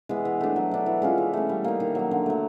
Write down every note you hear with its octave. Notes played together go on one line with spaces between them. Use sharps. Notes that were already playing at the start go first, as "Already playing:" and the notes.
E3 G#3 B3
E3
A3 D4
F#3
A3 D4
E3
G#3 C#4 F4
E3
A3 C#4
G3
A#3 D#4
D#3
F#3 A#3
D3
F#3 A3